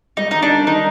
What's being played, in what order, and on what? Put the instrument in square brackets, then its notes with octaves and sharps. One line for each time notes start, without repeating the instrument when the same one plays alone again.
[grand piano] G3 [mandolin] D#4
[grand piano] D#3 [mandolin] D#4
[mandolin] D4
[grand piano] G3
[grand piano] D#3 [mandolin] D#4